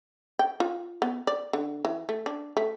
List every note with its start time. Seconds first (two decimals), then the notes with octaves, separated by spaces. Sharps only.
0.39 G5
0.60 F4
1.02 B3
1.27 D5
1.53 D3
1.85 E3
2.09 A3
2.26 D4
2.57 A3